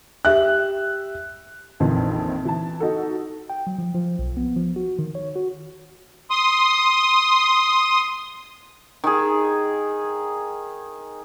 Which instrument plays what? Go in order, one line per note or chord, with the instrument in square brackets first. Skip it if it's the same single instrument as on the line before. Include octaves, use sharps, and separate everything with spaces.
[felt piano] G4 E5 F#6
[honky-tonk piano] A#1 F2 D#3 E3
E3 A5
D#4 F#4 A4
[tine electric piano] G5
F#3
F3
F3
B1
B3
F3
F#4
D#3
C#5
F#4
[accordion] C6 D#6
[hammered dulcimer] D#3 G#4